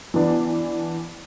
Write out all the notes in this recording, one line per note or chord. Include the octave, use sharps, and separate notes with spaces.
E3 B3 D4